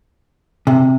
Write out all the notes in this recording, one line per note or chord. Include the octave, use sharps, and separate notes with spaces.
C3